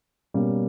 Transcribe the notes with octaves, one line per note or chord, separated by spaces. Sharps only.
B2 G3 A#3 C#4